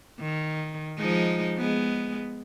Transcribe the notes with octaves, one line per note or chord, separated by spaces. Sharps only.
D#3
F3 G#3 D#4
G#3 B3